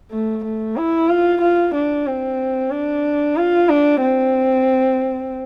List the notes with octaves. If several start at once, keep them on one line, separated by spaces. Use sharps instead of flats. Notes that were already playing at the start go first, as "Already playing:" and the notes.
A3
A3
E4
F4
F4
D4
C4
D4
F4
D4
C4